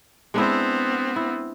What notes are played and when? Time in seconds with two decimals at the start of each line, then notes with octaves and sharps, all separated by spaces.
0.34 G#3 B3 C4 D4 E4
1.16 E4